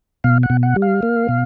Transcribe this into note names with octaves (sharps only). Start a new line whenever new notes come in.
B2 F5
F#5
B2
F#5
G3
F5
A#3
B2